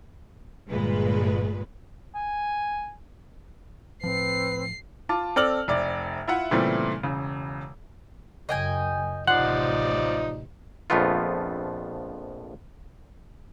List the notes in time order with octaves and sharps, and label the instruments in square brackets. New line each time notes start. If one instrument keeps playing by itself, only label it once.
[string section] G1 A#2 G#3 B4
[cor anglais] G#5
[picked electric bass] A2 F3 [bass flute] C4 [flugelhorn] B4 [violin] C7
[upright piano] F4 A5 D6
C4 A4 D5 A5 F6 F#7
F1 C3 D5
E4 F4 E5 F#5
A#2 C#3 E3 G3 A3 C4
E1 C#3
[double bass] F#2 C#3 [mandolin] D#5 G5 G#5
[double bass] A1 C3 [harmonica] F3 D#4 D5 [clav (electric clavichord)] F#5 [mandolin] C6
[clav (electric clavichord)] A#1 F2 F3 A3 B3 F4